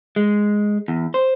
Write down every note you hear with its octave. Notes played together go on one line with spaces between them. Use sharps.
G#3
E2
C5